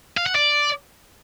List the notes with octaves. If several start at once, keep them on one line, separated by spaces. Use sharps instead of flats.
F5
F#5
D5